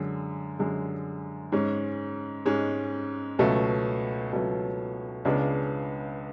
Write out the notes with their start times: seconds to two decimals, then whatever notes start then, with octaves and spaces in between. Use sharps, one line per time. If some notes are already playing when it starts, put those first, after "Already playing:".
Already playing: F#2 D3 G#3
0.59 F#2 D3 G#3
1.52 G#2 G#3 C#4
2.46 G#2 G#3 C#4
3.39 C#2 B2 F#3 A3
4.33 C#2 B2 F#3 A3
5.25 C#2 C#3 G#3 B3 D4